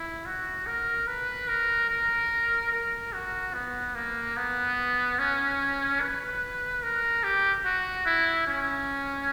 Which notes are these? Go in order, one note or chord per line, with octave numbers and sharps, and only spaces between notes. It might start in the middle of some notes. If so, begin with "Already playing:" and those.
Already playing: E4
F#4
A#4
B4
A#4
A#4
A#4
F#4
B3
A#3
B3
C#4
B4
A#4
G4
F#4
E4
C#4